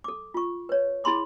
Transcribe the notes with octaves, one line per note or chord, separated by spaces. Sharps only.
A4 D6
F4 C#6
B4 C#5
E4 G#4 B5 C6 D6